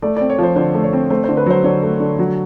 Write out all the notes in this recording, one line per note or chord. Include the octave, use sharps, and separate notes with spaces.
A3 D5
C4 D5
C#5
F3 C5
D3 C5
A3
C#5
C4
A3 C5
D3 C5
B4
F#3 C5
D3 C#5
A3
D3
F#3